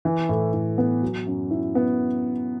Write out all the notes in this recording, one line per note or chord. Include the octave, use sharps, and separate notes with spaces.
E3
A2
A2
B3
F#3
F#2
E4
B3